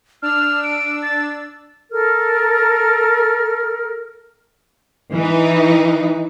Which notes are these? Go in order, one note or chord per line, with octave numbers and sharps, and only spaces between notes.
D4 E6 F6
D7
A6
A4 A#4 F6
E3 D#4